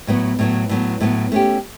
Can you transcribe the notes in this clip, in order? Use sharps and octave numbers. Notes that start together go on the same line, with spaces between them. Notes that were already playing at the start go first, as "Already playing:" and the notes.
A2 F#3 B3
A2 F#3 B3
A2 F#3 B3
A2 F#3 B3
A3 C#4 G4